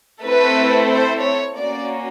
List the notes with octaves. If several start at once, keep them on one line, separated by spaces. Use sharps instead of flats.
A3 C4 E4 A4 B4
C5
C#5
A#3 C#4 F#4 D5